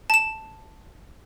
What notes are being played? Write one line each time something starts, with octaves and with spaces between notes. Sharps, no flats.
A5 E7